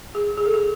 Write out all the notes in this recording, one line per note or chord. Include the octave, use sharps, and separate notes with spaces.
G#4
G#4
A4
G#4